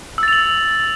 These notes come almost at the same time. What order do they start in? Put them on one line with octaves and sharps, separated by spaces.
E6 A6 F7 F#7